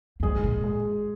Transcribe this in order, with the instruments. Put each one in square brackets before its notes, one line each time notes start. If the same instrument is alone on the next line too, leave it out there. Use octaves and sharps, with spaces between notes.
[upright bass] F2
[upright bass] G#2 [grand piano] G#3 G#4
[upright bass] A#2
[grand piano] G#3 G#4